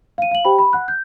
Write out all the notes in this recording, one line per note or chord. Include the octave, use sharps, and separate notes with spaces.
F5 D#7
F5 F#7
G4 C5 G5 B5
B5
F#5 F#6
G6